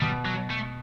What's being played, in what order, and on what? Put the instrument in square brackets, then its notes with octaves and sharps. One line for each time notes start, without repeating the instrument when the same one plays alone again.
[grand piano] B2 [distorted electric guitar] G3
[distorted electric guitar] F#3
A3